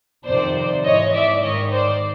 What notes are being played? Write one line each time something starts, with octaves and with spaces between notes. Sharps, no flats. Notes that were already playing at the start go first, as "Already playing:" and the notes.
F2 C3 D#3 C5 D5
G#2 E3 C#5 D#5
D5 E5
G#2 D#3 C#5 D#5
C5 D5